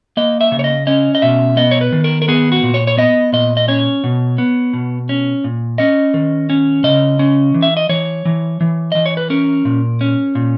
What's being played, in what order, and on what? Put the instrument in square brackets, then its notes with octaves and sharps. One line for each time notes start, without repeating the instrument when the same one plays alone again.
[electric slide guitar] A#3 D#5
E5
C#3
C#5
D#5
C#4 D#5
D#5
B2 E5
B3 D#5
C#5
B4
D#3
A#4
A#4
B3 G#4
F#4
A#2
C#5
C#5
B3 D#5
A#2 D#5
D#5
C#4 C#5
B2
B3
B2
C#4
A#2
C#4 D#5
D#3
C#4
C#3 D#5
C#4
E3
E5
D#5
E3 C#5
E3
E3
E3 D#5
C#5
B4
C#4 A#4
A#2
C#4
A#2